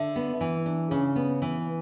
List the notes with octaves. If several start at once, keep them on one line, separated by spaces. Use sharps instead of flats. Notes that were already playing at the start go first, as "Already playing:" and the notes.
Already playing: D3 E5
B3
E3
D4
C#3
B3
E3